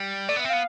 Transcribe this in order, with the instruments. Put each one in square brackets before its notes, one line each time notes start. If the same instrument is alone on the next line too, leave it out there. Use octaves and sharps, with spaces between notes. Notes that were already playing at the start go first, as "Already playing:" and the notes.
Already playing: [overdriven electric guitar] G3
[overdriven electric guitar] A3 [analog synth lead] D5
[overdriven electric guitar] B3 [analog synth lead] E5
[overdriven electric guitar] C4
[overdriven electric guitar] B3 [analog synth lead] F5